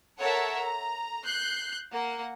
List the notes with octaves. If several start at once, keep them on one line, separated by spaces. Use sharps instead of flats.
A4 A#4 C#5 E5 F#5 A5
A#5
F#6 G6 C7
A#3 F#5